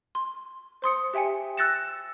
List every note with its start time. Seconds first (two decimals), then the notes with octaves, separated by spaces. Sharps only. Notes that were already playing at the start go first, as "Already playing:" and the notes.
0.15 C6
0.82 C5 C6 D#6 C#7
1.14 G4 E5 G5 G#5 C#7
1.57 E6 F#6 A6 A#6 C#7 E7